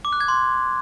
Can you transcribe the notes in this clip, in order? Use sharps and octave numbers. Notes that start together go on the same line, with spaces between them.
D6
F#6
G#6
C6